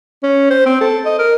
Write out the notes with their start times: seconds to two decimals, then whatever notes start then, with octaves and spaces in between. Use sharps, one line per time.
0.23 C#4
0.50 C5
0.66 C4
0.81 A4
1.05 D#5
1.19 A#4